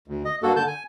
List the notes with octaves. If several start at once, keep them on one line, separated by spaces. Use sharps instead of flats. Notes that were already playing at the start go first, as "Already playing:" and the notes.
D2
D#5
G2 A#3 F#4 A4
D3 A5 G6
G#5